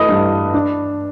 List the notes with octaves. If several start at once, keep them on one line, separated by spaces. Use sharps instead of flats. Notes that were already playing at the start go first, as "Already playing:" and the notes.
Already playing: E3 A3 B4 D#5 D#6
G2
D4